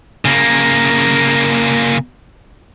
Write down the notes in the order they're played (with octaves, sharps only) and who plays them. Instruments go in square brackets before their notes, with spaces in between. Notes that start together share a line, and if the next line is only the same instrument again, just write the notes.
[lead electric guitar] C#3 A#3